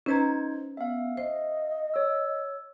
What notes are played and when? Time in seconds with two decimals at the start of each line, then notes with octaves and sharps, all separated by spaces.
0.06 C#4 D#4 B4 C5 A#5 G#6
0.77 B3 E5 F5
1.17 C5 D#5
1.94 C#5 E6